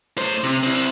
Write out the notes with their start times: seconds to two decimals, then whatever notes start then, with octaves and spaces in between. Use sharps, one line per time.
0.17 A2 C5
0.44 C3
0.63 C4 E4